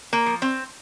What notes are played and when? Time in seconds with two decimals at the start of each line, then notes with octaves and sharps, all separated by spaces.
0.13 A#3
0.26 F3
0.42 C4